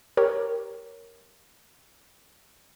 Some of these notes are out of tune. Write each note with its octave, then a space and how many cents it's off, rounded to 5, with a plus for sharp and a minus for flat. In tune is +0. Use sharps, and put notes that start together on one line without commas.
G4 +0 A#4 +0 C#5 +0